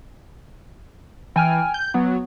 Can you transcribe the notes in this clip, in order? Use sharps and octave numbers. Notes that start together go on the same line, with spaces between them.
E3 G5 G#5 F6
G6
F#3 B3